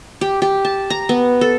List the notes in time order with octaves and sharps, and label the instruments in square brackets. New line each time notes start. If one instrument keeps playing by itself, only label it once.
[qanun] G4
G4
A5
A#5
B3
A4